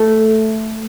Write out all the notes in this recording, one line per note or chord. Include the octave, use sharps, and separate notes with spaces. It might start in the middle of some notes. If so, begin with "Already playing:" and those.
Already playing: A3